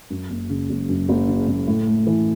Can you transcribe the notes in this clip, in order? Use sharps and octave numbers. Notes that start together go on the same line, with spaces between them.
F#2
F#1
C#3
F#1
F#2
F#1
C#3
F#1
A2
A3
E3